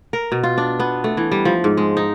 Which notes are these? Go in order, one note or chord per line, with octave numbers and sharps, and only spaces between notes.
A#4
B2
F4
D4
B3
A3
E3
G3
F3
G#2
G#3
D#4